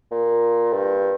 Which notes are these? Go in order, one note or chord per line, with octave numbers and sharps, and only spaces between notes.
A#2
G2